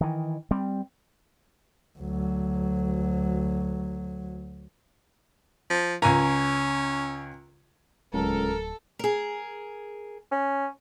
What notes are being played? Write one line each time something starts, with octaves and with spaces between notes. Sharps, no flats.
D#3 E3
G3 C4
D2 F#3
F3
C#2 C#4 G#5 A#5
D1 C#2 F#3 A4 A#4
G#4 A#4
C#4